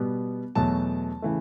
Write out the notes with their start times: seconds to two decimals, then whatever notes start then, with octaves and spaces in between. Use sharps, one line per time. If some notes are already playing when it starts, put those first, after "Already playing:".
Already playing: B2 G3 B3
0.55 E2 B2 F#3 A3 A5
1.22 C#3 E3 A3